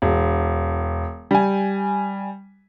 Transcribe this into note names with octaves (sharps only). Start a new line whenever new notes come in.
E1
G3 G#5